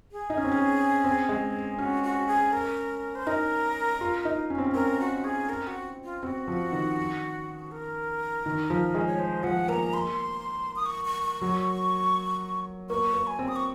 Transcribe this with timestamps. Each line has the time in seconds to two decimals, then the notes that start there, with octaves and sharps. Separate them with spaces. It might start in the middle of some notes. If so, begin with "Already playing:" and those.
0.12 G#4
0.30 D#4
0.37 C#4
0.44 C4
0.51 C#4
1.04 C4
1.29 G#3
1.78 C#4 F#4
2.04 F#4
2.28 G#4
2.53 A#4
3.15 C5
3.27 D#4 A#4
4.01 F4
4.25 D#4
4.50 C#4
4.58 C4
4.66 C#4
4.74 C4 A#4
4.99 F#4
5.24 G#4
5.49 A#4
5.67 F#4
6.04 F4
6.23 C4 F#4
6.48 F3
6.72 D#3
7.71 A#4
8.46 D#3
8.70 F3
8.94 G#3
9.07 C#5
9.19 C5
9.43 F3 F#5
9.69 A#3 A#5
9.94 C6
10.76 D#6
10.86 C#6
11.05 C#6
11.23 C#6
11.41 F#3
12.89 A#3 C#6
13.14 A#3
13.27 G#5
13.39 C4
13.48 D#6
13.56 C#6